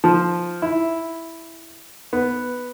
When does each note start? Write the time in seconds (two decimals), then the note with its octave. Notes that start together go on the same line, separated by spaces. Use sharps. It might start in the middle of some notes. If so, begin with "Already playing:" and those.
0.04 F3
0.62 E4
2.13 B3